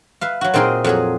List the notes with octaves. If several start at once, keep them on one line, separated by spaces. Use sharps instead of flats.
B4 E5 F5
F#3 F#4
A#2 C4 D#4 G#4 A#4 C6
F2 F#3 G#4